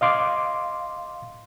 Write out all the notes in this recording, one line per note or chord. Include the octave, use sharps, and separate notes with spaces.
D#5 F5 C6 D6